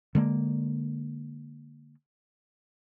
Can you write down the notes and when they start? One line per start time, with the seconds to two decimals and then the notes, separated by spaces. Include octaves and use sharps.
0.15 D3 G#3 A#3